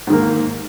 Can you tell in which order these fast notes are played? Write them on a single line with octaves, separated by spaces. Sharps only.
G#2 D#3 A#3